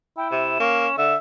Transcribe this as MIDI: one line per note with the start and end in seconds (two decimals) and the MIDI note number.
0.17 0.58 64
0.17 0.31 79
0.32 0.58 48
0.32 0.97 100
0.60 0.88 58
0.60 0.94 61
0.98 1.15 50
0.98 1.17 76
0.98 1.11 100